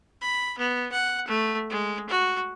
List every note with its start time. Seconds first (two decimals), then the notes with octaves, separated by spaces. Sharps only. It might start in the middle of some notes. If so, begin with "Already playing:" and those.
0.21 B5
0.58 B3
0.92 F#5
1.28 A3
1.70 G#3
2.09 F#4